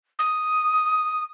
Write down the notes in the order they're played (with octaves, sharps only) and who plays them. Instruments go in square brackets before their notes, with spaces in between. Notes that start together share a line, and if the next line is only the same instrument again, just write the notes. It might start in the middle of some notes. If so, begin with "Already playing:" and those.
[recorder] D#6